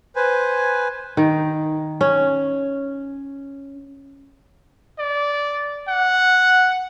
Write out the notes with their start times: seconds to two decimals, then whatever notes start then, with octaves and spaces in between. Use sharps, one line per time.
0.16 B4 C5 G#5
1.17 D#3
2.01 C#4
4.99 D5
5.88 F#5